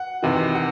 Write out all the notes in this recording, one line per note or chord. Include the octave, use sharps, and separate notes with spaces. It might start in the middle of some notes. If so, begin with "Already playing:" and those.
Already playing: F#5
E2 C3 D#3
F#5